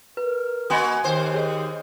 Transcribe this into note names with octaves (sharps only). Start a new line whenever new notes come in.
A#4 B4
A#3 F#4 D#5 G#5 C6 D#6
D#2 C5
G#4 C#5 D#5